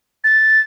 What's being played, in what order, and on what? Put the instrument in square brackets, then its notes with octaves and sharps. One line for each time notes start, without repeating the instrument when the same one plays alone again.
[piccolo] A6